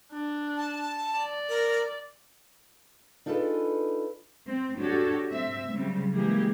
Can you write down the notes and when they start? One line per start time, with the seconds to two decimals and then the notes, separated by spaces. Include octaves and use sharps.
0.12 D4
0.57 A5
1.17 D5
1.49 A#4
3.26 D4 D#4 F4 G#4 A4 B4
4.47 C4
4.78 D4 F#4 G4 A4 C#5
5.31 C4 E5
5.73 C#3 F#3 G3 C4
6.14 E3 G#3 A#3 G4 G#4